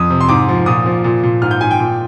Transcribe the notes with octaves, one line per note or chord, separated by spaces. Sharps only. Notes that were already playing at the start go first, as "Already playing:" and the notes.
Already playing: F2 D#6
C3
C6
G#2 D6
F3
A#2 D#6
F3
A#2
A#2
G#2 F6
G6
G#2 G#5
G5
A#2